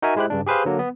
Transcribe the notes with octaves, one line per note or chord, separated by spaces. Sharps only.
D#4 F#4 A#4 E5 G#5
G#3 E4 G4 C5 F#6
G2 C#3 D4
G4 G#4 B4 C5 F5
D3 F#3 A#3
B3